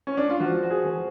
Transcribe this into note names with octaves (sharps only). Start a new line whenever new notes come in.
C#4
D4
F4
F3 F#4
F#4
G#4
F3